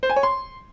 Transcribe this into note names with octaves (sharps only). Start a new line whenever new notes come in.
C5
G#5
C#5
C6